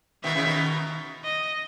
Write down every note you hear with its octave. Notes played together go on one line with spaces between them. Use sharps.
B2 D#3 E5
C#3 E3
B2 D#3
D#5